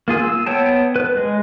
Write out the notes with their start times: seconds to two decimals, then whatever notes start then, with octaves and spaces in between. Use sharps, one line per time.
0.08 A#3 F4 G#4
0.22 E6
0.46 B3 C#5 G5 A5
0.96 B4
1.17 G#3